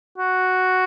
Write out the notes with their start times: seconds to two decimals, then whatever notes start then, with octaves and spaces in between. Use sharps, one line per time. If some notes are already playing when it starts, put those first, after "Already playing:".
0.18 F#4